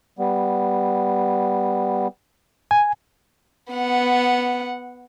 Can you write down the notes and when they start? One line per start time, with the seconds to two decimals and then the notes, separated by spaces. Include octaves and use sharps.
0.19 G3 B3
2.71 G#5
3.73 B3 F#5